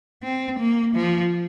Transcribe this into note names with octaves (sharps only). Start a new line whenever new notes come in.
C4
A#3
F3